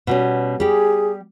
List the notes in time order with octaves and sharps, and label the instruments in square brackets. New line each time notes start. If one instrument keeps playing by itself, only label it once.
[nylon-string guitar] B2 G3 C#4
[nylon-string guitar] G3 G4 [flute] G#4